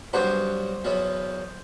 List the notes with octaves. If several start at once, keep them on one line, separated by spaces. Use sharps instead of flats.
G2 F#3 B3 D4 F#4 C5
E2 B2 F#3 B3